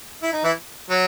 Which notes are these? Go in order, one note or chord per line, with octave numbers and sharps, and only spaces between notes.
E4
D#4
E3 E4
F#3